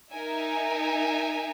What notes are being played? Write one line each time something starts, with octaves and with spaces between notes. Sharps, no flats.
D#4 A#4 E5 G#5